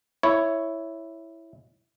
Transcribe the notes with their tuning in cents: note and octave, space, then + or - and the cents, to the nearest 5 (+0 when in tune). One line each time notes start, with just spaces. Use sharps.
E4 +0 C#5 +0